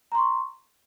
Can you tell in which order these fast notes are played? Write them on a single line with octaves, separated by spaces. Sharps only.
A#5 C6 C#6